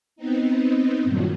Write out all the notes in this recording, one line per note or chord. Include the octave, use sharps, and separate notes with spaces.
B3 C4 D#4
G2 A#2 D#3 F#3